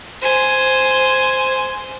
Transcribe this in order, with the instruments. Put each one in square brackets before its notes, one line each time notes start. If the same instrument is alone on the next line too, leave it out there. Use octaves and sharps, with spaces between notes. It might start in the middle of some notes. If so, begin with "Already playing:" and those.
[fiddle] C5 G#5